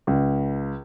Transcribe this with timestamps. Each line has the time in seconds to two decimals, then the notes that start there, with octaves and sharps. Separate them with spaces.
0.07 C#2